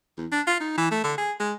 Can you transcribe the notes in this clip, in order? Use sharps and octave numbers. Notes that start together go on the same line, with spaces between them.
E2
D4
F4
D#4
E3
A3
D3
G#4
G#3